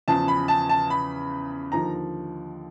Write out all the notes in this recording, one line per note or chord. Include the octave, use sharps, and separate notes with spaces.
E2 C#3 F3 A5
B5
A5
A5
B5
D#2 D3 F3 A#5